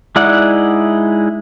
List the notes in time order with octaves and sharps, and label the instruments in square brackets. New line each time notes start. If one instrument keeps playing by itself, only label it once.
[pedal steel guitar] G#3 D#4 E4 D5 F#5